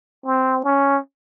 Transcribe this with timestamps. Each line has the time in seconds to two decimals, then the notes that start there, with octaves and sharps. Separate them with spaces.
0.25 C4
0.64 C#4